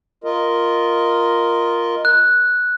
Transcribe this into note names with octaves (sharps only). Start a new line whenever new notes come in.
F4 A#4 D#5
F#6